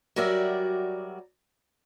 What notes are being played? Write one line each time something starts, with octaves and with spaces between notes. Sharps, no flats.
F#3 G3 F#4 A#4 D5 E5